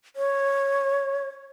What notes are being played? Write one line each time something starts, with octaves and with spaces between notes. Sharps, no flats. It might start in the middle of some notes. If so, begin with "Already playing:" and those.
C#5